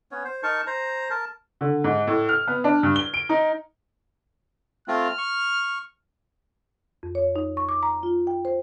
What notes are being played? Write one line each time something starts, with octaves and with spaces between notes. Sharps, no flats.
B3 C#4 C#5
C5
D#4 A#4 A5 C#6
C5 A#5
A#4 A5
D3
G#2
A2
F6
B3
D4
G2
G7
D7
D#4
A3 C4 F4 F6
C#6
F2
C#5
D#4
C#6
D6
A#5
F4
G5
C5